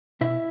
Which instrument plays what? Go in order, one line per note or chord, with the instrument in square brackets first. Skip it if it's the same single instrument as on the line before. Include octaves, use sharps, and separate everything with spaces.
[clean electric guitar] B2 E4 E5